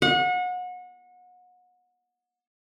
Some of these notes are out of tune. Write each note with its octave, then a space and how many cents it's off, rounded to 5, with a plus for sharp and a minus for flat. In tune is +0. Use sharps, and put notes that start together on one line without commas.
F#5 -30